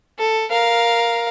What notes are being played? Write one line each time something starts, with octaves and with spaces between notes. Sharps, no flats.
A4
A#4 F5